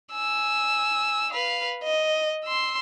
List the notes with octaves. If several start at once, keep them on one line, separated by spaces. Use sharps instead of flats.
G#5 E6
B4 F5
D#5
C6 E6